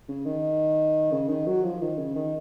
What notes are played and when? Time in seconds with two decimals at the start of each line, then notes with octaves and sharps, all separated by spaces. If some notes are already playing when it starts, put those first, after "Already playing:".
0.09 C#3
0.26 D#3
1.12 C#3
1.29 D#3
1.46 F#3
1.63 F3
1.81 D#3
1.98 C#3
2.15 D#3